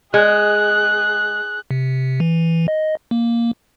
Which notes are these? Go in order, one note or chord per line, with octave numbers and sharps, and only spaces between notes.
G#3 G#4 F#6
C3
E3
D#5
A#3